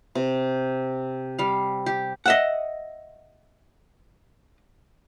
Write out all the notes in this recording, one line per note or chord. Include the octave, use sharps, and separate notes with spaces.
C3
G3 F5
G4
D#5 E5 F#5